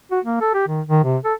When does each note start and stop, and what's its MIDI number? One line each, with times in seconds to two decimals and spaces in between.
0.11 0.20 66
0.25 0.40 58
0.41 0.51 69
0.54 0.65 67
0.68 0.81 51
0.87 1.02 51
1.04 1.17 48
1.25 1.34 69